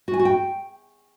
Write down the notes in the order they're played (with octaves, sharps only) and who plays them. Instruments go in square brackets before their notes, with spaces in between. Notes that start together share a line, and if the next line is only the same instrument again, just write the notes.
[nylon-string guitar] F#4
G#5
F#4
G5